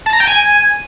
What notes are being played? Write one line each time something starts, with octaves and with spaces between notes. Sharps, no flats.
A5
A#5
G5
G#5